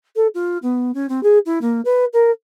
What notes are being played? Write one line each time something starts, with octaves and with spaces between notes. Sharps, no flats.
A4
F4
B3
C#4
C4
G#4
E4
A#3
B4
A#4